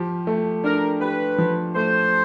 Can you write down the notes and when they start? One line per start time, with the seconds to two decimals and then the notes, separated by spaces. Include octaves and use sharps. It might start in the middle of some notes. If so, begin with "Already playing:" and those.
Already playing: F3 G4
0.27 A3
0.64 D4 A#4
1.00 G4 B4
1.38 F3
1.76 A3 C5